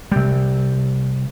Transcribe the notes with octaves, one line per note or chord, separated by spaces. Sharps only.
C3 G3